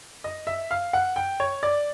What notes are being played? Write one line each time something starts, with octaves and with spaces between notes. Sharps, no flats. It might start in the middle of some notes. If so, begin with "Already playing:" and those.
D#5
E5
F5
F#5
G5
C#5
D5